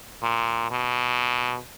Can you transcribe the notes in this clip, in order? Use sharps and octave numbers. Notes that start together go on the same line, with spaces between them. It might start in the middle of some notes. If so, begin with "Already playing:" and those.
A#2
B2